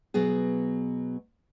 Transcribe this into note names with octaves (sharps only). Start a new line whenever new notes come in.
B2 F#3 B3 G#4